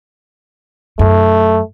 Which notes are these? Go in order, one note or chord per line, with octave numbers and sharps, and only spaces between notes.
F#2 A3